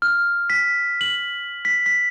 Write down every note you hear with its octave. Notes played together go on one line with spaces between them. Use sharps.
F6
B6
F#7
B6
B6